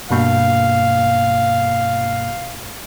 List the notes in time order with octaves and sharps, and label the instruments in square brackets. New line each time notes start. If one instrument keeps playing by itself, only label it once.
[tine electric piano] G2 B2 A#3 [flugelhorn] F5